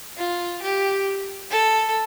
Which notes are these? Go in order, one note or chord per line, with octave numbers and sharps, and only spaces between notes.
F4
G4
A4